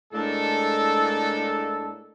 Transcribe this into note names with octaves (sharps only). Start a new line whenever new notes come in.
A2 G#3 A#3 D4 A4